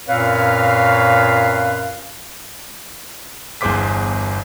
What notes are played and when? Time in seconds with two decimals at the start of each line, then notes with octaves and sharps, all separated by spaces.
0.08 F#2 A#2 C4 B4 C#5 F5
3.61 G1 E2 G#4 C5 D6 B6